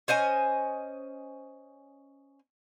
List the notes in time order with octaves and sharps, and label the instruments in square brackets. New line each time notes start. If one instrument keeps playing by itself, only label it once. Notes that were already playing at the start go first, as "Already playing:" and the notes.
[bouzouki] C#4 C5 D#5 G#5